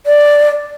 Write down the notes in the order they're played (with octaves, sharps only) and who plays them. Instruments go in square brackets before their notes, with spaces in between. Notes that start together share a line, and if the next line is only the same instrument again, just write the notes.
[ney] D5